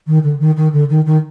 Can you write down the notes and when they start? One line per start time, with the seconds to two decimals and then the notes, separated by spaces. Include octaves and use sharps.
0.07 D#3
0.23 D3
0.39 D#3
0.57 D#3
0.72 D3
0.89 D#3
1.06 D#3